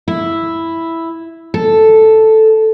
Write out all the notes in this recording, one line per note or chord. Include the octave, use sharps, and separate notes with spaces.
E4
A4